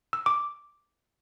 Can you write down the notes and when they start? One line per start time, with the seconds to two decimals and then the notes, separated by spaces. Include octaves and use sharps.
0.13 E6
0.26 D6